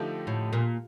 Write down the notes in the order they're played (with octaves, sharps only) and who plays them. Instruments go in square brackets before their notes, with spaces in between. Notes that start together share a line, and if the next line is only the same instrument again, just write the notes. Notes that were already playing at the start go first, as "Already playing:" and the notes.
Already playing: [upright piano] D3 F3 A3 D#4 G4
[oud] A2
A#2